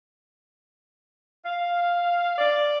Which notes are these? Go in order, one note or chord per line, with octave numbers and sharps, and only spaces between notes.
F5
D5